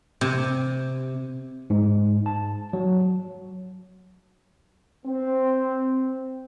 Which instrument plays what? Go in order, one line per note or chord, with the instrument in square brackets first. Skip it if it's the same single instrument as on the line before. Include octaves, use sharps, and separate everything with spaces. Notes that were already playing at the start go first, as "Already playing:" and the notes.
[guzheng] C3
[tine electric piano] G#2
A5
F#3
[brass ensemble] C4